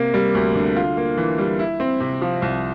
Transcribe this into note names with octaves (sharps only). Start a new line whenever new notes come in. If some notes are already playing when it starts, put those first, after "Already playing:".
Already playing: C3 A#3
G3
D2
D3
F4
A#3
E3
G3
E4
C4
C3
F3
C2